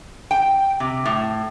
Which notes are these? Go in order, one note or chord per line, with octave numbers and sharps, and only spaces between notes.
G5
C3
A2